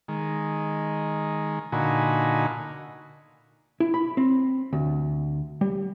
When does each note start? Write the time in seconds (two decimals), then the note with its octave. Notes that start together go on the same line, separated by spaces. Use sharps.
0.08 D#3 G#3
1.72 A#2 D3 D#4 F#4 G#5 B5
3.80 E4
3.94 B5
4.17 C4
4.73 D2
5.61 G3